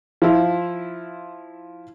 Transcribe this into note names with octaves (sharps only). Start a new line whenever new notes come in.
F3 E4 F4